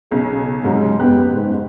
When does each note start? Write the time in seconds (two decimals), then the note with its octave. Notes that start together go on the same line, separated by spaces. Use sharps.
0.11 B1 C#3 G#4
0.64 C2 G#2 F#3 G#3
1.00 F#1 B3 G4 F#6
1.33 G#2